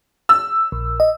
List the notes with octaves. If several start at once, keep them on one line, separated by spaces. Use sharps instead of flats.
E6
A#1
D#5